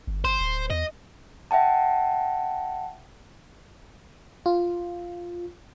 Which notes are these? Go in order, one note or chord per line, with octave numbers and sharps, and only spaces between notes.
G1
G1 C5
D1
E2 D#5
E5 F#5 G5 A5
F4